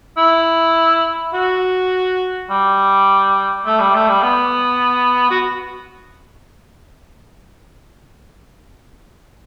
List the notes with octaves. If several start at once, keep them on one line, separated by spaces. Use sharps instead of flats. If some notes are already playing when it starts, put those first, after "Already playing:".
E4
F#4
G3
A3
G3
A3
G3
B3
F#4